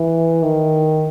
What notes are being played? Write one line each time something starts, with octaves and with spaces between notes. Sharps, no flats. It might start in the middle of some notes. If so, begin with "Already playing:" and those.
Already playing: E3
D#3